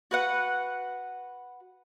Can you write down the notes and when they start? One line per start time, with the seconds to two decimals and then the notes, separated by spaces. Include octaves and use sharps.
0.11 F#4 B4 F#5